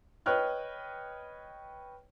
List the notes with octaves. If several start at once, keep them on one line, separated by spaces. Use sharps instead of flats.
B4 C#5 D#5 G5 F6 F#6